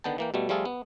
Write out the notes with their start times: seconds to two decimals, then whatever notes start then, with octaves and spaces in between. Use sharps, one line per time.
0.04 D3 D#3 B3 G5 A5
0.18 E3 A#3 G5
0.34 B2 G3 A3
0.49 F3 G3 A3 F4 G#4 A4
0.65 B3